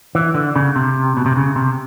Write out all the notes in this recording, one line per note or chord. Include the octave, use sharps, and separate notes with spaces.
E3
D3
C#3
C3
B2
C3
C#3
C3